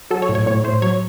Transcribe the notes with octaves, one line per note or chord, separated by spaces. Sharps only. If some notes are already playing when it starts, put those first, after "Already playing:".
F#3 A4
C#5
A2
C#5
A2 C#5
A2 C5
F#3 C#5